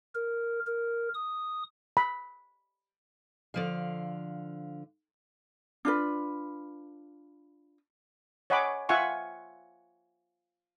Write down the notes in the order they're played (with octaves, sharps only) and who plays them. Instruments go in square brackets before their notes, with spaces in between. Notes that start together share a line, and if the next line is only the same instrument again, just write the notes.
[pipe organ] A#4
A#4
D#6
[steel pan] B5
[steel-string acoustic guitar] D3 F3 F5
[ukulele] D4 F4 B4
[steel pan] C#5 D#5 F#5 G#5 B5 D6
F4 E5 F#5 G#5 C#6